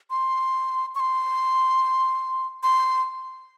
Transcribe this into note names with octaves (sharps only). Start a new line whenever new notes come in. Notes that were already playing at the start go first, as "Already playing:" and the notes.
C6
C#6
C6
C6